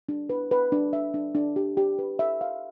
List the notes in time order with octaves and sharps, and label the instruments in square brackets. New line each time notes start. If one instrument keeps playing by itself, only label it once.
[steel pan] D4
B4
B4
D4
E5
D4
D4
G4
G4
B4
E5
F5